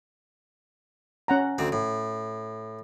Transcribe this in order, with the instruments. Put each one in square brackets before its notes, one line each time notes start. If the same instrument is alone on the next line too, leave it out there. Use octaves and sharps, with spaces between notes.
[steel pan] C#4 F#5 A#5
[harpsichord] D2 C4
A2